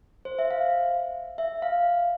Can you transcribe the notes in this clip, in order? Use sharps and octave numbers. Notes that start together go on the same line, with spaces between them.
C5
E5
F5
E5
F5